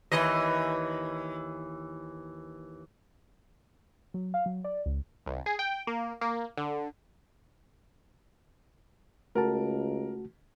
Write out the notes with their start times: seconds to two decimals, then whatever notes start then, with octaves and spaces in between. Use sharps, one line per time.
0.12 D#2 E3 D#5
4.14 F#3
4.34 F5
4.46 F#3
4.64 D5
4.86 C#2
5.26 C2
5.46 G#4
5.59 G5
5.87 A#3
6.21 A#3
6.58 D3
9.35 C#2 A3 F#4 A#4 A5